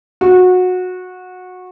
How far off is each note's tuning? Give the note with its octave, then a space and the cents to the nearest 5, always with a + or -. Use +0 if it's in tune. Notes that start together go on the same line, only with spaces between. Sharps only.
F#4 -20